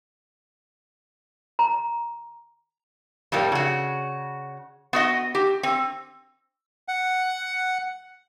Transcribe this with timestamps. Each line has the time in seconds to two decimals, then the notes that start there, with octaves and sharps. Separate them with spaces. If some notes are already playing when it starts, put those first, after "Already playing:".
1.59 A#5
3.32 F2 A2 G3 A#3
3.52 C#3 F#4
4.93 B3 F#4 D#5
5.35 G4
5.63 C4
6.88 F#5